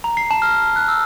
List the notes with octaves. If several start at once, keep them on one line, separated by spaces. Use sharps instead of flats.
A#5
C7
A5
F6
F6
F#6
E6